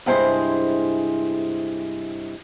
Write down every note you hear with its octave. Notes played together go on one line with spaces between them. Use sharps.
G2 C3 G#3 E4 G#4 C5